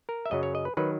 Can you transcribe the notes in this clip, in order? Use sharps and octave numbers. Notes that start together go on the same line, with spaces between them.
A#4
E5
F#2 C#3 F#3 D#5
C#5
D#5
B4
D#3 F#3 B4